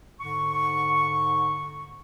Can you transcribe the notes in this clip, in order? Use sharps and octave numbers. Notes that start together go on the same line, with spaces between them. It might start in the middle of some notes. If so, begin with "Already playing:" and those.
G#2 D3 C#6